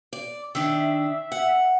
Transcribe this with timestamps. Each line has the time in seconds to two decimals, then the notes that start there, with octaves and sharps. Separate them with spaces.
0.13 D5
0.55 D#3 D4 E5
1.32 F#5